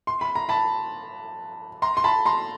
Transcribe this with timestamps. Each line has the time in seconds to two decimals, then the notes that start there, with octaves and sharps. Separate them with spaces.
0.07 C6
0.21 B5
0.35 A#5
0.49 A5 B5
1.82 A#5 C6
1.97 C6
2.04 A5 B5
2.26 A#5 C6